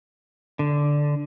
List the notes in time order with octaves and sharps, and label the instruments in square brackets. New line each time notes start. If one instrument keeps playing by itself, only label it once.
[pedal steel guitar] D3